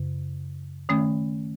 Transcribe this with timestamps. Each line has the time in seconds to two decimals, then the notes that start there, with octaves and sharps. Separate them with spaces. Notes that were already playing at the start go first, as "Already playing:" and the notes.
Already playing: F#2 C#3
0.89 D#3 A3 C#4